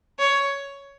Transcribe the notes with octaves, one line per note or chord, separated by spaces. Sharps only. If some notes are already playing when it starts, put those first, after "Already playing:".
C#5